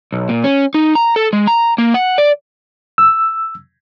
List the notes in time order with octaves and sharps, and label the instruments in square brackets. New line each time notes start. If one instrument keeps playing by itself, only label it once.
[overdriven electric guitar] B1
A#2
C#4
D#4
A#5
A4
G#3
A#5
A#3
F#5
D5
[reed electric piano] E6